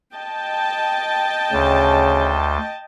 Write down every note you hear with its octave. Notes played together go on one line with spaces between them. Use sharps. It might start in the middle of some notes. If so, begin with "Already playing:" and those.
D#5 G5 A5
D2 C#3